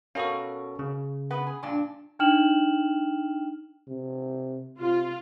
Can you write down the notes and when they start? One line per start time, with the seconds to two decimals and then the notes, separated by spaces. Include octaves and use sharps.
0.15 B2 C#4 F#4 A4 A#4 F5
0.79 C#3
1.31 B3 B4 F#5
1.47 G#4
1.63 G2 A#2 D4
2.19 D4 D#4 G5 F6 E7 F#7
3.88 C3
4.79 C3 F4